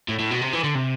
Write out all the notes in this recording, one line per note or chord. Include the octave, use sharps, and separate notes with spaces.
A2
A2
B2
C3
E3
D3
C3